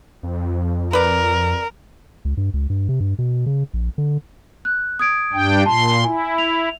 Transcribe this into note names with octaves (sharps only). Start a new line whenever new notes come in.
F2
A#4 B4 D5
C#2
G2
C#2
G2
C3
G2
B2
C#3
A#1
D3
F#6
D#6 G#6 D7
G2 D4 G5
A#2 A5 C6
E4 G#5
F7